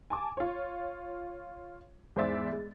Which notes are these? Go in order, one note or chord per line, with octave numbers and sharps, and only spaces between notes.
G#5 A5 D6
F4 C#5
E2 G#2 C5 D5 E5 A6
G#3